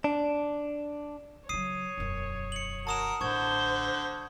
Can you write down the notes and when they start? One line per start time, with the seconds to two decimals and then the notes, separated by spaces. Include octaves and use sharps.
0.04 D4
1.49 C#3 F#3 C#5 D#6 C7 D#7
1.97 E1 F#2
2.52 C#7 F#7
2.87 F#4 A#4 A5 D#6 E7
3.21 A1 D3 C5 C#6 G6 G#6